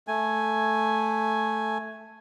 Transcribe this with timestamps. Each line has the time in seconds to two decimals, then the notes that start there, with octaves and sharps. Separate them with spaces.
0.08 A3 G#5